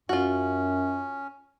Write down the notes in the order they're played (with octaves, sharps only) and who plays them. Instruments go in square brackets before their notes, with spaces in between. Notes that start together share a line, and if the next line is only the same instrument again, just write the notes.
[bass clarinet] F#2 [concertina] C#4 [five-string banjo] F4 F#4